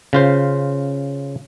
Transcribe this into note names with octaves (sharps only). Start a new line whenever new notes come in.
C#3 F4 C5